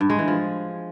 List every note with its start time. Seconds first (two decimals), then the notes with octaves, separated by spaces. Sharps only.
0.01 G2
0.10 G#3
0.19 E3
0.28 F3